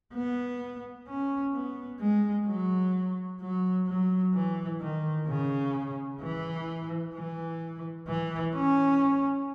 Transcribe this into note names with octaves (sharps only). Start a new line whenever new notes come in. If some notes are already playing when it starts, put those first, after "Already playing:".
B3
C#4
B3
G#3
F#3
F#3
F#3
E3
D#3
C#3
E3
E3
E3
C#4